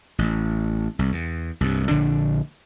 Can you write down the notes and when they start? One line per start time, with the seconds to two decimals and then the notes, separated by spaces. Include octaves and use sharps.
0.19 A1
0.99 C2
1.12 E2
1.61 C2 G2
1.89 A#1 D3 D4